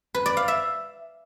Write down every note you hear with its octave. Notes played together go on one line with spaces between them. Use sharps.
B4
D5
F5
E5